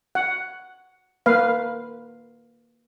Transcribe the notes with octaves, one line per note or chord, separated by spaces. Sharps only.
F#5
A#3 B4 F5